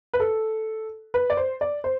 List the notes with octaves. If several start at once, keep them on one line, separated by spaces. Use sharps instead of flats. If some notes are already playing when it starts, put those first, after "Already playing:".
B4
A4
B4
D5
C5
D5
C5